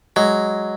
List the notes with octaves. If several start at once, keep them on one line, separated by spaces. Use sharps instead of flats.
F#3 G#3